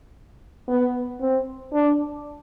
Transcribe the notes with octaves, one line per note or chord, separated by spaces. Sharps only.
B3
C4
D4